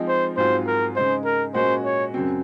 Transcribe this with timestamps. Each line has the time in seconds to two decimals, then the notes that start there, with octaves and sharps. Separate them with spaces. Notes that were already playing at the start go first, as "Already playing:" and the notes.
Already playing: F3 G#3 C4 D#4
0.08 C5
0.37 G#2 F#3 C4 F4 C5
0.67 A#4
0.96 C#3 G#3 D#4 C5
1.25 A#4
1.54 A#2 G#3 C#4 F#4 C5
1.84 C#5
2.14 F#2 C#3 F#3 C4